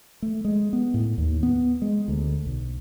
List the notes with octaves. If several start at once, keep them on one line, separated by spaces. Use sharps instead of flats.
A3
G#3
B3
A2
D#2
B3
G#3
D2
B1